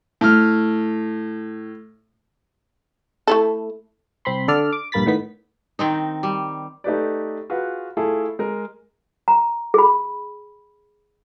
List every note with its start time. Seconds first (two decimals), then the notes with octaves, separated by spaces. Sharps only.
0.21 A2 F6
3.27 A3 E4 A4
4.25 C2 C4 B5 C6
4.48 D3 A4 D5 F6
4.73 D6
4.92 A#1 G2 A#3 B5 A6 B6
5.06 A2 D#3 B3 B6
5.79 D#3 C4 D#4
6.23 G3
6.84 A3 D#4 G4 B4 D5
7.50 F4 F#4 G#4 B4
7.97 A3 E4 F4 G#4 A4
8.39 G#3 A#4
9.28 A#5
9.74 G#4 B5